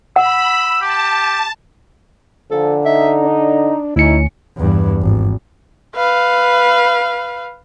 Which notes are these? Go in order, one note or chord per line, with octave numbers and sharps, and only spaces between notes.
F#5 B5 E6
G4 A5
A#2 D3 F3 A4
D#4 E5
D4
D2 C#4 D#4 E4 C#7
E2 G2
G#1
B4 F5